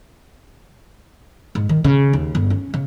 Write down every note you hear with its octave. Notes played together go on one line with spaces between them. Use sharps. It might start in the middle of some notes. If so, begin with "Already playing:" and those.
G#2
D#3
C#3
D#2
G1
C#4
C#3